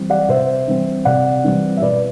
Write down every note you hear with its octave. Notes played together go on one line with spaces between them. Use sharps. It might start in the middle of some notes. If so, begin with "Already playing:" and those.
Already playing: E3 G3 C4
D5 F#5
C3 C5 E5
E3 G3 C4
C3 D5 F#5
E3 G3 C4
E5
B2 B4 D5